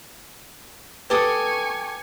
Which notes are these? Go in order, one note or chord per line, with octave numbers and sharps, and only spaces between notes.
G4 A4 B4 G#5 C#6 D#6